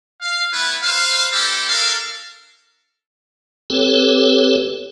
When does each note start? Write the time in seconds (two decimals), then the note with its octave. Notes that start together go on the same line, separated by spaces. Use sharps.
0.22 F5
0.53 A3 B3 E4 B4
0.83 B4 C5 F5
1.33 C4 E4 G4 A4
1.69 D4 A4 A#4 F5
3.70 C4 G4 A4 B4 C#5